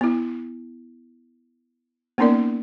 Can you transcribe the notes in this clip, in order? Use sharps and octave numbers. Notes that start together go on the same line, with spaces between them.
B3 E4
A#3 B3 C#4 D#4 A#4 D5